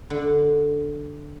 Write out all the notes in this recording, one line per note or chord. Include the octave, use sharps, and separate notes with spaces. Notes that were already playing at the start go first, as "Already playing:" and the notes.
D3